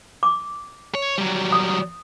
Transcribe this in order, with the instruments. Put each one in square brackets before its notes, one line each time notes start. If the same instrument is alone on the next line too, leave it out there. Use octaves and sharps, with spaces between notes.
[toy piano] D6
[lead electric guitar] C#5
F#3 G3
[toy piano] D#6